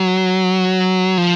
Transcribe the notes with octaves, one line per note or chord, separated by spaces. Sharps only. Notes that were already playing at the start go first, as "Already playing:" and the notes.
Already playing: F#3
F3